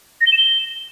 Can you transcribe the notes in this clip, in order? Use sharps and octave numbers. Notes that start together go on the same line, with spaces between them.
A#6
G7
E7
G7